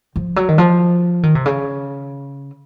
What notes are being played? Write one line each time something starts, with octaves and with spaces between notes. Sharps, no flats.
F3
F#3
D#3
F3
D#3
C3
C#3